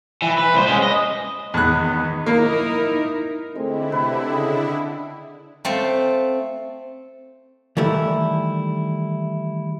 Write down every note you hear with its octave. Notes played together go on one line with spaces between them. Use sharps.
E3
B4
C2 C5
G#3 C#4
D#5
E2 D#3 B3 F#6
A#3 D#4 E4 A#4
D3 G#3 A3 C4 E4
C3 B4
C#3 D#5 G5
A3 C4 F4
D#3 E3 G3 A3 E4